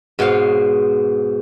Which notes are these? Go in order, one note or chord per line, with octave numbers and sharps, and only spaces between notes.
G#2 B2 C#5 F5